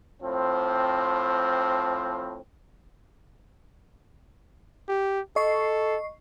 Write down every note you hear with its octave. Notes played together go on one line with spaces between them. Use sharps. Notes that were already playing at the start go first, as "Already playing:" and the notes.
A2 F3 C4
G4
A4 D#5 C#6 C7